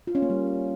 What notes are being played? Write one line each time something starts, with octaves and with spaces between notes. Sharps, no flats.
F4
C#4
A#3
G3